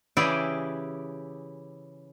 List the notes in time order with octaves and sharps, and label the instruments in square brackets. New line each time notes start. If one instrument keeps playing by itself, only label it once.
[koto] C#3 E3 E4 G4 G#4 D5